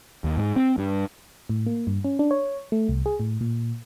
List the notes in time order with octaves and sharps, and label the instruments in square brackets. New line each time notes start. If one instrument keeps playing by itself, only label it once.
[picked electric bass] D#2
G#2
C4
G2
[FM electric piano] A2
A#3
G2
C#4
D4
C#5
A3
C2
G#4
A2
A#2